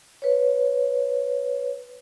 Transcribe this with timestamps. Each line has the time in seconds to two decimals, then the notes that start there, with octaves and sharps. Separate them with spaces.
0.22 B4 C#5